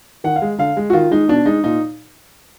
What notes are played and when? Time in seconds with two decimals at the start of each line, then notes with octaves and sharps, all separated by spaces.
0.24 D#3 F#5
0.36 F5
0.42 G#3
0.59 D3 F5
0.77 G#3
0.90 F#4
0.93 D#3 F4
1.11 G#3 D#4
1.28 B2 D4
1.45 G#3 D#4
1.64 A#2 D#4